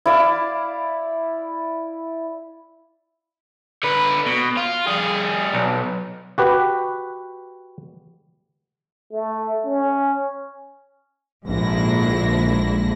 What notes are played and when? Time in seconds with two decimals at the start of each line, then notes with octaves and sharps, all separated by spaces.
0.06 E4 D5 F5
3.83 D3 B4
4.26 B2
4.57 F4
4.87 G3 G#4
5.54 B1
6.38 F#4 G4 B4
9.12 A3
9.65 C#4
11.47 A#1 G#2 D3 E4 A#6